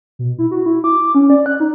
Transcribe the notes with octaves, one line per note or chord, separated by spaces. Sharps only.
B2
E4
F#4
E4
D6
D6
C#4
D5
F#6
D#4